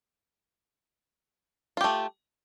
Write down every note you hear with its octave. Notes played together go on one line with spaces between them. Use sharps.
A3 F4 G4